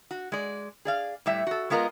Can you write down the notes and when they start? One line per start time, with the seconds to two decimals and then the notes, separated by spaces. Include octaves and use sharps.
0.11 F#4
0.32 G#3 D5
0.85 G#4 D5 F5
1.26 A2 G3 E5
1.47 F#4 A4
1.70 G#3 B3 F4 A#4 D#5